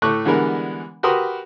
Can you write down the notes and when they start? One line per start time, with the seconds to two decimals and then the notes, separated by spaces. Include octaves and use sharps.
0.02 A2 A3 C#6 D6 F#6
0.25 D3 E3 G3 G#3 B3 A#4
1.03 F#4 G4 A#4 B4 C6 D#6